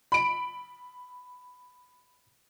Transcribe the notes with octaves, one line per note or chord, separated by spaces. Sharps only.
B5 D7